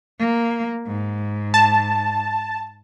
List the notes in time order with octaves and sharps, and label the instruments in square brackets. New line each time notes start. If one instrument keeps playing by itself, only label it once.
[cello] A#3
G#2
[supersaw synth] A5